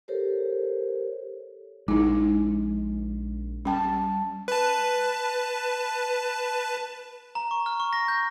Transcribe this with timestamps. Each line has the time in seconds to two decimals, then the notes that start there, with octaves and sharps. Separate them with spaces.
0.08 G4 A4 A#4 C5 C#5
1.88 A#1 G#3 D#4 E4
3.65 G3 C#4 G5 A5
4.48 B4 A5
7.35 A#5
7.51 C#6
7.66 F6
7.80 C#6
7.93 A#6
8.08 G6